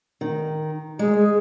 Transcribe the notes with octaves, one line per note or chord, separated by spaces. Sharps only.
D#3
G#3 G#4